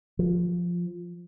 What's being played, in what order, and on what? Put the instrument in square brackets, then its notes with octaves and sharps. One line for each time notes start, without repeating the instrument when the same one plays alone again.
[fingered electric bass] F3